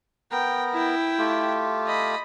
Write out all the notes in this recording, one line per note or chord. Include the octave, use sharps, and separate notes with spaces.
B3 A#4 G5 A#5
E4 G5
A3 F4 G4
D#5 B5